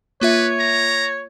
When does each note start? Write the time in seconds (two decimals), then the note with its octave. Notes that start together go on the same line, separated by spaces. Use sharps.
0.21 A#3 F4 B4 C#5 E5
0.59 A#5